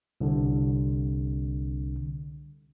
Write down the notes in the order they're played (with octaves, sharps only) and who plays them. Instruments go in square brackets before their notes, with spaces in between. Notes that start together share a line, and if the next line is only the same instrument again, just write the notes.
[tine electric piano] C2 D3